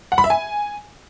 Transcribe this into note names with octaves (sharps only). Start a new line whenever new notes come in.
F#5
B5
E5
G#5